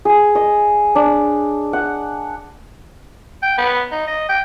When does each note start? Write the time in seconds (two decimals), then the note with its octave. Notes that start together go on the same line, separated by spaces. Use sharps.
0.05 G#4
0.35 D#5
0.95 D4
1.73 F#5
3.43 G5
3.58 B3
3.92 D#4
4.07 D#5
4.29 G5